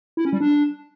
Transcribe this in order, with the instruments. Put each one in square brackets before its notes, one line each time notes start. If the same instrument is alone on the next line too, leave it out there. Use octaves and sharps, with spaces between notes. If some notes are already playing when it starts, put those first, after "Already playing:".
[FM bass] E4
C#4
G3
D4